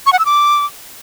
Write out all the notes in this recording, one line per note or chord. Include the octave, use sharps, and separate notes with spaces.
C#6
F#5
E6
D6